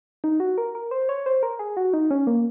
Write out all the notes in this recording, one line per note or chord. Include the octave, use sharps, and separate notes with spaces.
D#4
F#4
A#4
A#4
C5
C#5
C5
A#4
G#4
F#4
D#4
C#4
A#3